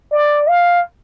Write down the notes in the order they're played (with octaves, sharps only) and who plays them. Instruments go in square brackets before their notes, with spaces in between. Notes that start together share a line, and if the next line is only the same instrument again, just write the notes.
[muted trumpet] D5
F5